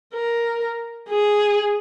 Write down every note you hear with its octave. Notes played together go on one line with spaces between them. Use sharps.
A#4
G#4